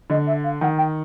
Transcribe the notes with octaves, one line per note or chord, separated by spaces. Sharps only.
D3 D#5
E5
F5
D#3 F#5
G5